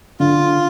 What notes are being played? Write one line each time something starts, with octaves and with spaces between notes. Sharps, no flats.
D3 F4